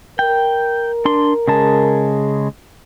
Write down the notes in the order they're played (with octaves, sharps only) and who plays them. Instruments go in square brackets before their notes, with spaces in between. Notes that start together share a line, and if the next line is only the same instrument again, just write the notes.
[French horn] A#4 [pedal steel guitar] G5
[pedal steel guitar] D4 C6
C#3 G#3 A5